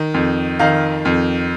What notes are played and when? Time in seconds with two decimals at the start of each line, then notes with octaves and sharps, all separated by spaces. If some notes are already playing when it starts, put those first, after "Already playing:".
Already playing: D#3
0.14 F2
0.59 D#3 F5
1.05 F2